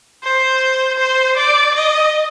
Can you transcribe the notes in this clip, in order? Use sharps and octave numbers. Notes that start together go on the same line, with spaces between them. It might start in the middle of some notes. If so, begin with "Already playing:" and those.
C5
C5
D5
D#5